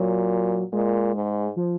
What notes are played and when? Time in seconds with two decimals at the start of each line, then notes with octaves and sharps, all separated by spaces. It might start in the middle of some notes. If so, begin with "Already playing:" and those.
Already playing: A#2 F#3
0.73 A#2 G#3
1.14 G#2
1.56 F3